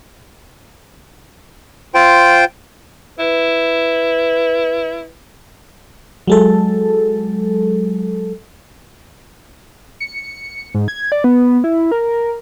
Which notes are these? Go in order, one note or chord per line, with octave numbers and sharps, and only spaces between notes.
F4 C5 G5
E4 B4
F#3 G#3 A4
C#7
G#2
G#6
D5
B3
E4
A#4